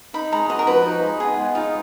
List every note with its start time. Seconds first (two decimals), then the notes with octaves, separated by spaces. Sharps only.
0.14 D#4 B5
0.32 G#3 A#5
0.49 F#4 D#5
0.59 A#4
0.67 F3 B4
0.85 D#4
1.03 G#3
1.20 B3 G#4
1.38 G#3
1.55 D#4 F4